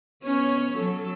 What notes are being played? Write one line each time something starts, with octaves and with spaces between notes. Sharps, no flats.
B3 C#4 C#5
F#3 A4